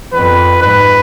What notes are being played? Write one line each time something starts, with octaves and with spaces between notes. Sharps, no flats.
F2 B4
G#2 B4